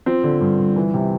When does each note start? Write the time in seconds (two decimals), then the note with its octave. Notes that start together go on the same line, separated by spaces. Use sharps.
0.06 F3 C4
0.24 D3
0.41 G2
0.59 G2
0.76 E3
0.94 C3